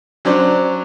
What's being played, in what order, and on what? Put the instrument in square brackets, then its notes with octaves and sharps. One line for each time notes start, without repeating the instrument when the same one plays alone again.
[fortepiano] F#3 C#4 D4 C5